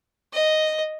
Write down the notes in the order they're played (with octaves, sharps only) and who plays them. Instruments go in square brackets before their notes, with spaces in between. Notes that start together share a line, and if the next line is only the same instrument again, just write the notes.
[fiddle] D#5